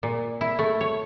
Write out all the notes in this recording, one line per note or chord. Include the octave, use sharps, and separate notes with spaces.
A#2
E4
A3
C#5